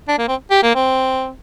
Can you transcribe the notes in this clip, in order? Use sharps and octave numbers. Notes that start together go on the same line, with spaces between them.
D4
A#3
C4
G4
A#3
C4